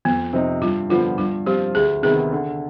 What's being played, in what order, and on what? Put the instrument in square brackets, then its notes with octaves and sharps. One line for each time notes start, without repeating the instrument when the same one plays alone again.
[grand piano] F2 [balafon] B3
[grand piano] C3 F3 C4 D#4
[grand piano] G2 [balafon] F4
[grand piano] D3 F3 B3 [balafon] F4
[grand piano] G2 [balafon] F4
[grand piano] F3 C4 F4 [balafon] G4
[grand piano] D2 [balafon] G#4
[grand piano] C3 D#3 B3 [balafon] G#4
[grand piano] D3